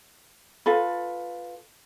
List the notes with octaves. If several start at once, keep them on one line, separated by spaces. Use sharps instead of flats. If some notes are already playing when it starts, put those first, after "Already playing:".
F4 A4 B4